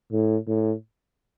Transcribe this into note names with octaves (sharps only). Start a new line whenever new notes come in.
A2
A2